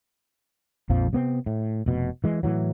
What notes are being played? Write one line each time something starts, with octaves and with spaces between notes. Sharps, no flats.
A#1 F2 F3
C3 B3 C4
A2
F1 B2
E3 G#3
A2 E3 F#3